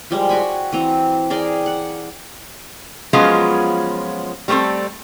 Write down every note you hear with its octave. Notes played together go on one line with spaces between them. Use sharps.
F3 G3 G#3
F#4 G5 G#5 B5
E3 C4 A#5
G#4 A#4 D5 G5
F#5
F3 F#3 G#3 B3 C#4 F4
G3 A3 A#3 C4 A4